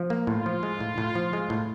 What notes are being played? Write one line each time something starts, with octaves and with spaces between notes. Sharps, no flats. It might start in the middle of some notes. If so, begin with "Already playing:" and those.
Already playing: F3
A#3
A2 F4
F3
G#3
A2
A2
F3
G#3
A2